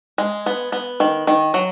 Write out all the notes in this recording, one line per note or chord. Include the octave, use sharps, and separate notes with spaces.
G#3
B3
B3
D#3
D#3
F#3